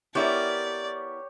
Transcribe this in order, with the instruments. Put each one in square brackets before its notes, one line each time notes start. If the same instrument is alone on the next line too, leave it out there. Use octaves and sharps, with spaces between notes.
[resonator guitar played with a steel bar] B3 E4 A#4 [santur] G4 C#5 [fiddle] D5